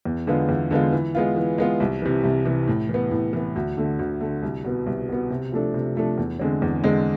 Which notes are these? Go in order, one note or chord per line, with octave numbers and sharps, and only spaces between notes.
E2
D3 G#3 B3 F4
E2
D3 G#3 B3 F4
E3
G#3 B3 F4
E3
G#3 B3 F4
C2
C3 E3
C2
C3 E3
A2
E3 B3
A2
E3 B3
D2
D3 A3
D2
D3 A3
C2
B2 B3
C2
B2 B3
C3
F3 A3 D4 A4
C3
F3 A3 D4 A4
E2
D3 G#3 C4
E2
D3 G#3 C4